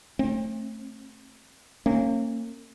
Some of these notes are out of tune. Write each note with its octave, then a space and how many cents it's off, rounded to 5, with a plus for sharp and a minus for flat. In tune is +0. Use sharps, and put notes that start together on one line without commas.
A3 +0 C4 +40
A#3 -30 C#4 -30